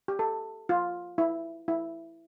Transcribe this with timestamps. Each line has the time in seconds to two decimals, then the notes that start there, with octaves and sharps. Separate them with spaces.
0.08 G4
0.19 A4
0.69 F4
1.18 E4
1.68 E4